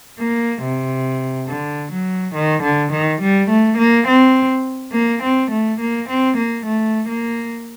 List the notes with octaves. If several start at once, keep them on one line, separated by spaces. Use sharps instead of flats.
A#3
C3
D3
F#3
D#3
D3
D#3
G3
A3
A#3
C4
A#3
C4
A3
A#3
C4
A#3
A3
A#3